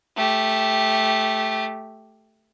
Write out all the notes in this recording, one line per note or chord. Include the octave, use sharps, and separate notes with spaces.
A3 G4